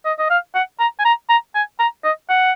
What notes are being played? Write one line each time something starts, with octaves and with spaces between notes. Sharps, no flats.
D#5
D#5
F5
F#5
A#5
G#5
A#5
A#5
G#5
A#5
D#5
F#5